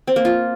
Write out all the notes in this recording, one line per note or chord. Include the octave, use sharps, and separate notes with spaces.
C4
A#3
F4